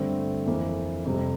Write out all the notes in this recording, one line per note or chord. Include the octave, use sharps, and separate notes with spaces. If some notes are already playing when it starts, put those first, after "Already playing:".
Already playing: G2 D3 A3 C4
F2 E3 A#3
F2 C3 G3